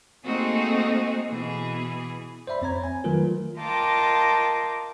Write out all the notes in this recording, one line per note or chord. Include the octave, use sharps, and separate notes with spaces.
A3 A#3 C4 D#4 F#4 G#4
B2 E3 G#4
C5 D5 E5 B5
F2 C4 C#5 A#5 G#6
G#5
D#3 F#3 A3 F4 A#4 B4
F4 A#4 D#5 G5 A5 D6